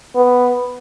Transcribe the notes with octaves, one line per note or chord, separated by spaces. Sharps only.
B3